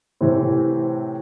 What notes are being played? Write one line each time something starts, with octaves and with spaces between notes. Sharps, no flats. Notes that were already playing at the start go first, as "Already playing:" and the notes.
A2 C3 E3 C4